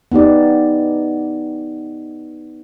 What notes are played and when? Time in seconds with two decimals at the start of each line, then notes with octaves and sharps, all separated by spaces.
0.12 B3 D#4 G4 D5